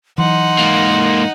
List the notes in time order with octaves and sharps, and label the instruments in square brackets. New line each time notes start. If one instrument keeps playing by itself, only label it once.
[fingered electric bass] E3 F#3 [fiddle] D#4 F#5 [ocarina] C6
[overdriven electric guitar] G#2 A#3